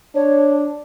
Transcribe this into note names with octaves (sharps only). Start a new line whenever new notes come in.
D4 C#5